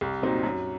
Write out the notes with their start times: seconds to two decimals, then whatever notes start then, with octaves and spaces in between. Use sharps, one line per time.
0.01 C2
0.22 A#2 F#3 C4 D#4
0.43 F#2